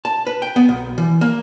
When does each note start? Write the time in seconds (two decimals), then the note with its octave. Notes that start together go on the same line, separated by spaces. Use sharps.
0.05 A5
0.27 B4
0.42 G5
0.56 B3
0.69 B1
0.98 E3
1.21 A#3